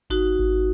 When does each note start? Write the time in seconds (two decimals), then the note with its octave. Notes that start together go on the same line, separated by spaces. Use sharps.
0.10 G#1 D#4 F#4
0.38 G#1